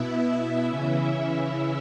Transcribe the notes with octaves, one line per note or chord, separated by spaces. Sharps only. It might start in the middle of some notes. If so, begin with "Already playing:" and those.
Already playing: B2 B3 E4 E5
C#3 E3 C#4 E4 E5